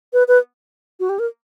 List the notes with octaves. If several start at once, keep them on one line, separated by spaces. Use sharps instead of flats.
B4
B4
F#4
G4
A#4